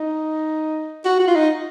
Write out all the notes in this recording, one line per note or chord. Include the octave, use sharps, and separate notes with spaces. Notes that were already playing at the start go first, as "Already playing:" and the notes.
Already playing: D#4
F#4
F#4
F4
D#4